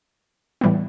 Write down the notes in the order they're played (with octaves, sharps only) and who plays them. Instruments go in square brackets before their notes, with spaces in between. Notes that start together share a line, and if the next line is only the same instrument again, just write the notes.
[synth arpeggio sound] A2 E3 G3 B3